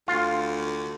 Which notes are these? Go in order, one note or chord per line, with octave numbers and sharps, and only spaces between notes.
D2 F4